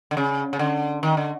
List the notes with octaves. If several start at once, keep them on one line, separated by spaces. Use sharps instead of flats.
D3
C#3
C#3
D3
D#3
D3